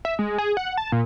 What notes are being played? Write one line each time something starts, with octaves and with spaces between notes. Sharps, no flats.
E5
G#3
G#4
F#5
A5
A#2